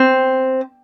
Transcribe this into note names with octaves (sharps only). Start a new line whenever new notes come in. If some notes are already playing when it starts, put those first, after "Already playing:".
Already playing: C4